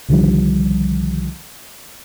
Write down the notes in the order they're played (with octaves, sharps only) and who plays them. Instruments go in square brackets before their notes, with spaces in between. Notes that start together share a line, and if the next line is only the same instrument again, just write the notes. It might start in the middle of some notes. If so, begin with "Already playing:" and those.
[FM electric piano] C2 D3 D#3 F3 G3